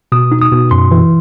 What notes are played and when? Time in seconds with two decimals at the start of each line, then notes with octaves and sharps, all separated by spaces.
0.12 B2 D#6
0.32 D#4
0.42 D#6
0.52 B2
0.71 F#2 C6
0.91 E3